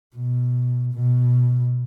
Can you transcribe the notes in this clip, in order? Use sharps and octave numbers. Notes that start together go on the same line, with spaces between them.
B2
B2